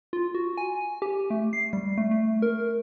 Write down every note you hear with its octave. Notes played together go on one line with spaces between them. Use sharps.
F4
F#4
G#5
G4
A3
C7
G3
A3
A3
A#4